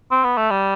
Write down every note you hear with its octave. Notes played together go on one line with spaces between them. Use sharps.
C4
B3
A3
G3